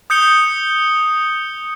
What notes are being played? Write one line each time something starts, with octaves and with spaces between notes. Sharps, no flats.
D#6 G6 C#7 G7